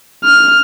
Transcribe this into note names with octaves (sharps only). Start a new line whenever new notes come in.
F6